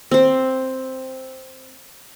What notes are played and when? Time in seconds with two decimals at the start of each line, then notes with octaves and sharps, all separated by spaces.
0.11 C4 C5